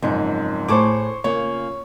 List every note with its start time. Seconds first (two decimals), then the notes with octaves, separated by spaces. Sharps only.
0.03 F#1 F2 G#2 C#4
0.68 A2 G#4 C5 A5 C#6 D6
1.24 C#3 A#3 F4 C#5